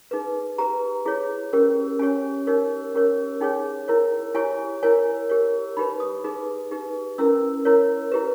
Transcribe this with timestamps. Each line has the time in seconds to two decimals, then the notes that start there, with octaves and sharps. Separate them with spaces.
0.11 D#4 G#4 B4
0.58 G4 B4 A#5
1.06 E4 G#4 C#5
1.53 C#4 G4 A#4
1.99 C#4 G4 C#5 G#5
2.47 D#4 G4 A#4 C#5
2.94 C#4 G4 A#4 C#5
3.41 D#4 G#4 C#5 G5
3.88 E4 A#4 C#5
4.35 E4 G4 C#5 G#5
4.83 E4 A#4 C#5 G#5
5.29 G4 A#4 C#5
5.77 D#4 G4 B4 B5
6.00 D#6
6.24 D#4 G#4 B4
6.71 D#4 G4 B4
7.18 C#4 E4 A#4 E6
7.65 E4 A#4 C#5
8.12 E4 G4 B4